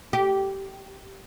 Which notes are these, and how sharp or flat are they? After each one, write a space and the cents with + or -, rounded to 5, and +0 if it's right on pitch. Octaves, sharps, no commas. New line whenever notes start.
G4 -15